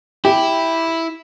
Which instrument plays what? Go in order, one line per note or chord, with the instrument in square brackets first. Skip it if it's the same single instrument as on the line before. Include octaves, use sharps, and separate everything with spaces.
[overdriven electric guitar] E4 [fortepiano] G4